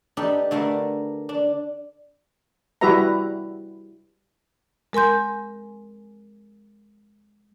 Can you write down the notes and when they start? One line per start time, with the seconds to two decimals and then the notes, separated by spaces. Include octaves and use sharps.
0.17 D4 D#4 G4 A4 B4
0.51 D3 A3 D4 A#4 B4
1.29 D4
2.81 G3 E4 F#4 B4 E5 A#5
4.93 G#3 A#4 G#5 C6 G6